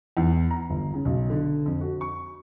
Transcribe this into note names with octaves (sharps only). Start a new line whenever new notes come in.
E2
A#5
G1
C#3
B1
D3
F2
F#4
C#6